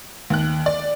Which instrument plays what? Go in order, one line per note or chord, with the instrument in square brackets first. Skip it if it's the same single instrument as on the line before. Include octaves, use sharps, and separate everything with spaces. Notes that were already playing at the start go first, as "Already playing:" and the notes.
[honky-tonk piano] D#2 F#6
D5